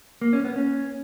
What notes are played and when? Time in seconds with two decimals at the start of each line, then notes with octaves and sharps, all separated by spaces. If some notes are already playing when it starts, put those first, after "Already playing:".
0.21 A#3
0.33 C#4
0.44 B3
0.56 C#4